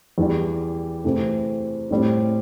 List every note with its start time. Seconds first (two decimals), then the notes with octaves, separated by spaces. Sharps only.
0.18 E2 E3 G3
1.04 C3 E3 A3
1.91 A2 G3 C4